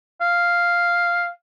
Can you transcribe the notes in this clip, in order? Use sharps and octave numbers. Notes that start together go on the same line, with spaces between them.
F5